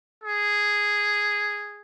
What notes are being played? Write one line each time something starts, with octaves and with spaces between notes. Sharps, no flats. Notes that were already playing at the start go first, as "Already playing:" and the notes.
G#4